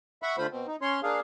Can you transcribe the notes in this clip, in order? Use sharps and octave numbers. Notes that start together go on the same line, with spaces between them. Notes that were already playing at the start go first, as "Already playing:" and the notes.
E5 F#5 B5 C#6
D3 A3 F4 C5 B5
B2 C4
D#4
C#4 C#5 C6
A#3 D4 G#4 F5